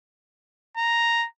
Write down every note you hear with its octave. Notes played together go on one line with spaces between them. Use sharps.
A#5